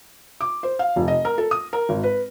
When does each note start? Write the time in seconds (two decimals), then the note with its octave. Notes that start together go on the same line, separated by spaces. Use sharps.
0.41 D6
0.63 C5
0.79 F5
0.96 F1
1.08 D#5
1.25 A#4
1.38 A4
1.51 D#6
1.73 A#4
1.89 G#1
2.03 B4